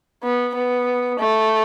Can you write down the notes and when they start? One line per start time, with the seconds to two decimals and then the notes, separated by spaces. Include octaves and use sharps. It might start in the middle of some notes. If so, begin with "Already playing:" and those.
0.23 B3
0.55 B3
1.19 A3